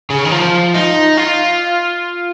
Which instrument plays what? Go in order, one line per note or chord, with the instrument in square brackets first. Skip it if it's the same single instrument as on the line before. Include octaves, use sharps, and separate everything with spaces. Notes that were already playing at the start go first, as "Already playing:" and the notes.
[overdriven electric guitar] C#3
D#3
F3
D#4
F4